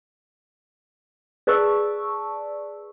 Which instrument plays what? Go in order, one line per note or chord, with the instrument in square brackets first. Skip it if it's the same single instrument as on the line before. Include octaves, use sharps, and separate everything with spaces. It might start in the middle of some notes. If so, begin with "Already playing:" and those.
[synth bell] G#4 B4 D5 A5 C#6 E6